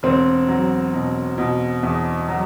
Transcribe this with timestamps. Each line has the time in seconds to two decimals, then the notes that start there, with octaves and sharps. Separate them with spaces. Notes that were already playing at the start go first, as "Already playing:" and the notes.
0.03 E1 C4
0.48 F#3
0.93 B2
1.38 B2
1.83 E2
2.28 F#3